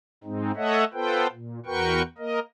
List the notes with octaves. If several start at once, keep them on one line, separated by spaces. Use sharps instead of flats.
G#2 G#3 C4 D#4
A3 A4 C#5 D#5 E5 F#5
B3 F4 A4 B4 C5 G5
A#2
E2 F#4 A#4 B4 G5 C#6
A#3 A#4 D#5